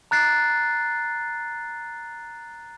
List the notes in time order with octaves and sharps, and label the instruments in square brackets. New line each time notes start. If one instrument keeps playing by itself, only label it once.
[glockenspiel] A#5 F#6 A6 C7